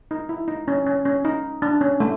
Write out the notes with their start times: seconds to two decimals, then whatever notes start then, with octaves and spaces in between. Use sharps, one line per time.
0.11 D#4
0.29 E4
0.48 D#4
0.68 C#4
0.86 C#4
1.05 C#4
1.25 D#4
1.62 D4
1.81 C#4
2.00 A3